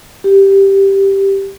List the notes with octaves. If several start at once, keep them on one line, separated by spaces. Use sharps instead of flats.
G4